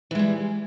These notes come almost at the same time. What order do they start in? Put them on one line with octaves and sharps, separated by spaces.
E3 G#3 G3